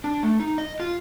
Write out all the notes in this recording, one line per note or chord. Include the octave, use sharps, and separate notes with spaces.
D4
A3
D#4
D#5
F4